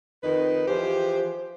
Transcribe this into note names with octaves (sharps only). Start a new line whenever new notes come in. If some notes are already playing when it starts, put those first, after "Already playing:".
F2 D#3 D#4 B4
E3 F3 G4 G#4 C5